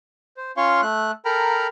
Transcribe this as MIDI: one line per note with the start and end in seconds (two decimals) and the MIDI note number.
0.37 0.52 72
0.57 0.81 61
0.57 0.81 65
0.57 0.81 73
0.57 0.81 77
0.57 0.81 84
0.57 0.81 85
0.82 1.11 57
0.82 1.11 90
1.25 1.67 69
1.25 1.67 70
1.25 1.67 79
1.25 1.67 82
1.25 1.67 83
1.25 1.67 89